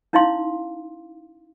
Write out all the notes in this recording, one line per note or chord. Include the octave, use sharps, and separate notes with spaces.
C#4 D#4 E4 F5 C6